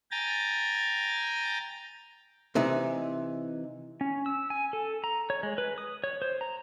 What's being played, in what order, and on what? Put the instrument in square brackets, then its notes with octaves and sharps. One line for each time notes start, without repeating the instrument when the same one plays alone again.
[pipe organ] G5 G#5 A#5 A6
[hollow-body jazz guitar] C3 E3 D#4
[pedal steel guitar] C#4
E6
G#5
A4
A#5
C#5
G#3
B4
D#6
C#5
C5
A#5